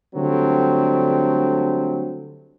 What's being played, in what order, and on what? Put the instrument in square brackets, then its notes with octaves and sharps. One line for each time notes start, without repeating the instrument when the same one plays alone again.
[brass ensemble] D3 F#3 G3 A3 C4